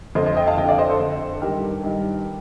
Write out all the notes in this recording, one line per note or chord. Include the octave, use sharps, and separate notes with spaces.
F2 D3 C5 D#5
C5 D#5
D#5 G5
F5 A5
F2 D3 D#5 G5
D5 F5
C5 D#5
A4 C5
F2 D3
A4
G2 D#3 G4 A#4
G2 D#3